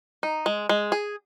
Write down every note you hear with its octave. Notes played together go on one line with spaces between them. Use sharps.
D#4
G#3
G#3
G#4